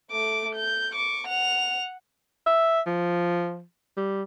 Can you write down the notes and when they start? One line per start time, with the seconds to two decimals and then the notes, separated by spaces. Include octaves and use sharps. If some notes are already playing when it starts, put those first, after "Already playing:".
0.11 A3 D6
0.55 G6
0.93 C#6 D6
1.27 F#5 F7
2.47 E5
2.86 F3
3.97 G3